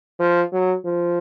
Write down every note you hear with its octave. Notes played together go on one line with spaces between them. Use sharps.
F3
F#3
F3